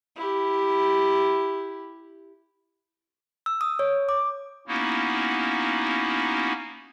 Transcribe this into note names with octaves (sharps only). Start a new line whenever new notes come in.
E4 G4
E6
D#6
C#5
D6
A#3 B3 C#4 D#4 E4 F#4